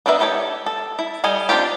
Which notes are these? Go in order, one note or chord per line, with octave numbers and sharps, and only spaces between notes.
B3 D4 A#4 B4 E5
D#4 E4 G4 A4 C#5
A4
E4
G3 A4 D#5 G#5
C4 D4 D#4 F4 G4